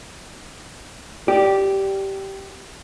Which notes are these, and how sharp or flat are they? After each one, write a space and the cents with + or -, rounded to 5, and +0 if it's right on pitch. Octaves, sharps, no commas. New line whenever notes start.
G4 -10 D5 +0